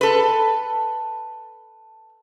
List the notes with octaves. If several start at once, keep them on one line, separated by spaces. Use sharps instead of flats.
A4 B4